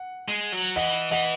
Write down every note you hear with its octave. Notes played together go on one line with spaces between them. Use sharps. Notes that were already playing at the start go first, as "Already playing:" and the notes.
Already playing: F#5
G#3
F#3
E3 D#5 F#5
E3 D#5 F#5